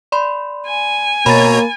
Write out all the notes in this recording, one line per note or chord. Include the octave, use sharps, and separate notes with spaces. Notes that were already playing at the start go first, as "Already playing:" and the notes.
D5 B5 C6
G#5
B2 A#3 C#5 A#5 B5 A6